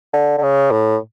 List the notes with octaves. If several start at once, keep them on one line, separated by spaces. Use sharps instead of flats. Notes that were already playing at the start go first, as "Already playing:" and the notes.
D3
D3
C#3
A2